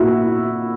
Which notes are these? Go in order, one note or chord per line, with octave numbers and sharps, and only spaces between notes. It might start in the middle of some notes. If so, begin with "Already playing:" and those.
Already playing: A#2 E4 F#4